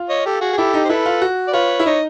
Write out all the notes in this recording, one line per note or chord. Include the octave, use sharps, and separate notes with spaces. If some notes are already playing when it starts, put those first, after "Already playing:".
Already playing: F4
C#5 D#5
G4 A4
F#4 G#4
G#4
E4 G4 A4
D#4
C5
E4 A4 B4
F4
F#4
D5
F4 B4 C#5
E4
D#4 C#5 D#5